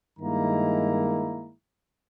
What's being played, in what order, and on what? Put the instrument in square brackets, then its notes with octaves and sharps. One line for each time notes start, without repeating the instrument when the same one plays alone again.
[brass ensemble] G2 D#3 G#3 A#3 E4 A#5